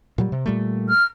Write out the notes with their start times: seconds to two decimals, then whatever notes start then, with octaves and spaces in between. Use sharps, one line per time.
0.18 A#2 F#3 G3
0.32 C3
0.46 A#2 G3 A3
0.88 F6